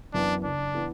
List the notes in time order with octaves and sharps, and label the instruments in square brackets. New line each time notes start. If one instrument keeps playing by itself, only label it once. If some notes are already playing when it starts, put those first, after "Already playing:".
[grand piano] F#2 E3 B3 [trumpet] D4
[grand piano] F#1 [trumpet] D4
[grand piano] E3 B3